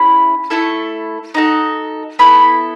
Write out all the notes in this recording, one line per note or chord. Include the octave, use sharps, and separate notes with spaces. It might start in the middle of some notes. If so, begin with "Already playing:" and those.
Already playing: C#4 E4 G#4 B5
A3 E4 A4
D#4 F#4 A4
B3 E4 A4 B5